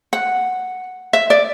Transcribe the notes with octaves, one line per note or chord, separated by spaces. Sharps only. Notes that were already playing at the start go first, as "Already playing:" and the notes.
F#5
E5
D5